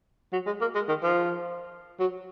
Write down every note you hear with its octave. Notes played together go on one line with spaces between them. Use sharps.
F#3
G#3
A#3
G#3
D#3
F3
F#3